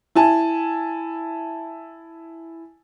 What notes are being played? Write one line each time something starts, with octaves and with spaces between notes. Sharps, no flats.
E4 G#5 A5